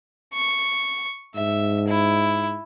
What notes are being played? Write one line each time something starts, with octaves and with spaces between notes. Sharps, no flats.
C#6
G#2 E5
E4